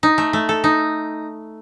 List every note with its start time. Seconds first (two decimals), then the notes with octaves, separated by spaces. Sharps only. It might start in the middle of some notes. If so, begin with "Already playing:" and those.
0.03 D#4
0.18 A3
0.33 A3
0.49 A4
0.64 D#4